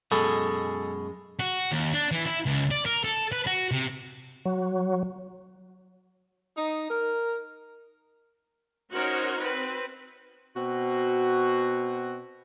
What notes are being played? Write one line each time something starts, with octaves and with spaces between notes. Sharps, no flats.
F#2 B2 G#3 G#4 A4
F#4
D#2
D4
E3
E4
C#2
D5
A#4
A4
B4
F#4
C3
F#3
D#4
A#4
C#4 D#4 F#4 A#4 C5 C#5
C4 B4
B2 C4 F#4